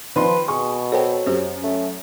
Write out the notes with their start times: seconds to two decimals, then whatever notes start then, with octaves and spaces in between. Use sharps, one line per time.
0.16 D#3 F3 B4 D5 C6
0.48 B2 G#4 C#6
0.92 F#3 A4 C5 G5
1.26 F#2 G4 C5
1.64 A3 C#4